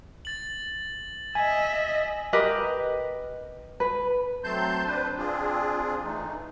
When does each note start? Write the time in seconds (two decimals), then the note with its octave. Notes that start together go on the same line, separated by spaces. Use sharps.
0.25 A6 F#7
1.35 D#5 E5 G#5
2.33 G4 A#4 B4 D#5
3.80 B4
4.44 F#3 A3 C4 A5 C6 G6
4.86 D4 B4 C5
5.18 C4 D4 F4 G#4
6.04 E3 A3 D#4